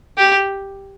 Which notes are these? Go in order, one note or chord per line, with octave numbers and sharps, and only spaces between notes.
G4